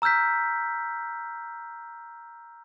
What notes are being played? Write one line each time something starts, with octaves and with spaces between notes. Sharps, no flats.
A#5 E6 F6 G6 B6